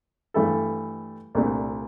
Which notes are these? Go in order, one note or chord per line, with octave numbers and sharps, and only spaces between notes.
G2 E3 A3 E4 A4
C2 A#2 A3 D4